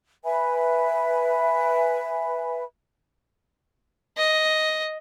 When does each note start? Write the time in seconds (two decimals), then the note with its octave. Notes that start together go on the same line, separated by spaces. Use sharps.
0.25 B4 E5 G#5 B5
4.18 D#5